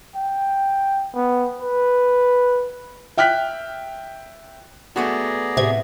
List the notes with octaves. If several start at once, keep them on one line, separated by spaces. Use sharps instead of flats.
G5
B3
B4
E5 G5 F6 F#6 B6
A3 B3 F#4 G#4 D5 A#5
A2 C3 G#6